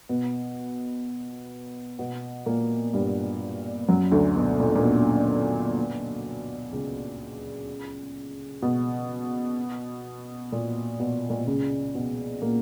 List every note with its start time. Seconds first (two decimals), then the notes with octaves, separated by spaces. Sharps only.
0.09 B2 B3
1.99 B2 B3
2.46 A#2 A#3
2.94 G2 G3
3.88 F#2 F#3
4.12 D2 D3
4.36 B2
4.59 A#2
4.75 A#2
4.83 B2
6.72 C#2 C#3
8.62 B2
10.52 A#2
11.00 B2
11.30 A#2
11.39 B2
11.47 C#2 C#3
11.95 B2 B3
12.42 A#2 A#3